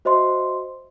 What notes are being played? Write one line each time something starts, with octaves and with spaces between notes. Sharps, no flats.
F#4 C5 D#5 E5 C6